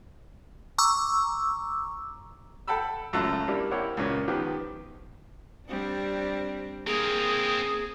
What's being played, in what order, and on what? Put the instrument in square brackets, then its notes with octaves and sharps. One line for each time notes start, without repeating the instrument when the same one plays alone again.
[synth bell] A#5 C#6 D6 E6
[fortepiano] A4 F#5 G5 A5 B5 E6
C#2 F#2 A3 F4 E6 F#6
G3 A#3 D4 E4
A#3 C4 E4 G4 C#5 F#5
C#2 A#2 C#4 A#4
D#3 F3 B3 G4
[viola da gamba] G3 C4 D4
[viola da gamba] A#3 [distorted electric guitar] C4 A#4 [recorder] G#4